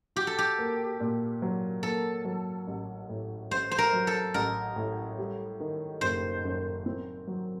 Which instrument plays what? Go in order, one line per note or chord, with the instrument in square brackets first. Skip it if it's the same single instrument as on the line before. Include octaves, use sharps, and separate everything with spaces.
[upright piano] F#4 [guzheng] G4
[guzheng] A4
G4
[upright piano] A#3
A#2
F#3
[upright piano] A#3 [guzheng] A4
[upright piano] F#3
A1
A2
[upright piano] A1 [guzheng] C5
[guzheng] C5
A#4
[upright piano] F#3
[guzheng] A4
[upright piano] A1 [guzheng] A#4
[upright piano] A2
G3
D#3
[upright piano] F#1 [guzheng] C5
[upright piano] F#2
C4
F#3